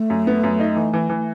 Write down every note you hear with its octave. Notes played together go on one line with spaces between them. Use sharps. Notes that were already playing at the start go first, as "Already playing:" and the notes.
Already playing: A3
F#2
B3
F#2
D#4
E3
E3
E3